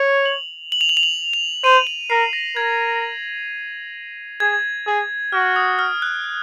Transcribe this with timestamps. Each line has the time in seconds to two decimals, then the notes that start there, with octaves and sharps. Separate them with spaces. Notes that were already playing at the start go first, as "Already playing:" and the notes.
Already playing: C#5 F7
0.26 F#7
0.72 F#7
0.81 F7
0.89 F#7
0.97 F7
1.03 F#7
1.33 F7
1.64 C5 D#7
1.87 F7
2.10 A#4 C7
2.33 A#6
2.56 A#4 G#6
4.40 G#4 G#6
4.87 G#4
5.32 F#4 F6
5.56 D#6
5.79 F6
6.02 F#6